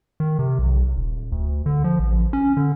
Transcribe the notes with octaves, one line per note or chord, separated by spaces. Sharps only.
D#3
C3
B1
D#1
D2
D3
F3
A1
C#4
D3